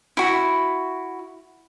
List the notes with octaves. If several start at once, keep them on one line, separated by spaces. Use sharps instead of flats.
E4 F#4 B5